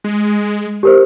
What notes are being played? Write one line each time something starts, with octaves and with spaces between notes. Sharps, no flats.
G#3
G4 A#4 C5